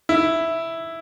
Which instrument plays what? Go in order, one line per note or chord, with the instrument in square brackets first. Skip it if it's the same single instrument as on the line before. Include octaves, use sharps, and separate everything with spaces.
[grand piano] E4